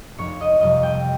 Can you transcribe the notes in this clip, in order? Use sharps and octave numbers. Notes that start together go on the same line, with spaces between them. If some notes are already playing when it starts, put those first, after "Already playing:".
F1 C#5
D#5
F2 C3 G3 C4 D#5
G5